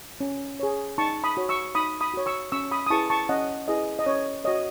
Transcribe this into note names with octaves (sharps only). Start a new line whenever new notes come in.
C#4
G#4 C#5
D#4 A5 C#6
B5 D#6
F#4 C#5
C#6 E6
D#4 B5 D#6
B5 D#6
F#4 C#5
C#6 E6
C#4 C#6 E6
B5 D#6
D#6
E4 G#4 B4 A5 C#6
A5 C#6
C#4 D#5 F#5
E4 G#4 B4 D#5
D#5
C#4 C#5
F#4 C#5 D#5